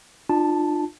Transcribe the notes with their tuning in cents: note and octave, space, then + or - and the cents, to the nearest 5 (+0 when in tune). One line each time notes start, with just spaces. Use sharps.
D4 +45 F4 +5 A5 +0